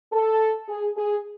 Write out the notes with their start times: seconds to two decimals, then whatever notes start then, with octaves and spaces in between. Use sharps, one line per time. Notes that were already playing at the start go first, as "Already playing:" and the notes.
0.13 A4
0.68 G#4
0.97 G#4